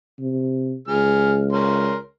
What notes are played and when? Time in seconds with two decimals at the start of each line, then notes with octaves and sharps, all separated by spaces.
0.19 C3
0.88 C#2 G#4 F6
1.52 C#4 A#4 C6